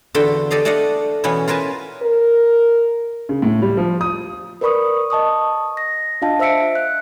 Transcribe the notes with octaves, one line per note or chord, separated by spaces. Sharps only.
E2 D3 F4 F#4 E5 G5
G4 A4 D5 D#5 F5
A3 D4 D5 D#5 F5 F#5
B2 E3 B3 C#4
F4 A#4 B4 G#5 A5
A#4
C#3
A2
G3
F3
D#6
A#4 B4 D5 B5 C#6 D#6
D#5 A5 C#6 D#6
A#6
D4 F4 D#5 F5 A5
C5 E5 E6 B6 C#7 D7
F#6